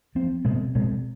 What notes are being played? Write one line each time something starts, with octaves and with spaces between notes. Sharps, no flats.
F3 C4
B2 G#3 C4
B2 G#3 C4